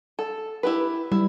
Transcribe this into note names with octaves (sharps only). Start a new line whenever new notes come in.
A4
E4 G4 B4
G3 E4